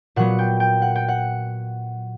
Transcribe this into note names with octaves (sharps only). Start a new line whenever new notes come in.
A#2 F#3 B3 F#5
G5
G5
F#5
G5
F#5